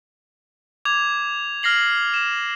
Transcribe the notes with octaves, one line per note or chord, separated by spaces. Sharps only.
D6 G#6 F7
F6 A#6 C7 F#7
E7